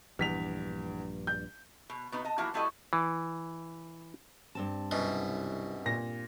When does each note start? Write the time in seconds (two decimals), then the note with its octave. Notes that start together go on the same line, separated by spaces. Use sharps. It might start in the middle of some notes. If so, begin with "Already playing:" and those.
0.19 A#1 E2 G2 B6 F7
1.27 G6
1.90 B2
2.12 B2 B3 D#4
2.25 D#5 A5
2.38 E3 F3 A#3 E4 F#4
2.54 G3 A3 E4 F#4 A4 D#5
2.93 E3
4.55 G2 C4 A5
4.91 C2 F#2 B2
5.86 A#2 A#6